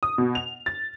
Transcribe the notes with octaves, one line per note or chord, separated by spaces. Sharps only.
D#6
B2
F7
A6